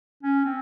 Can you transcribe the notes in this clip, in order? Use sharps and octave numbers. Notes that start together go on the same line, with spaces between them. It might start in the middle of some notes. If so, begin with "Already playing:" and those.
C#4
C4